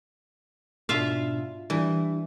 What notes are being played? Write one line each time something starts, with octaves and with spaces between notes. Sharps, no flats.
G#2 B2 D4 F4 E5 F5
E3 G3 D4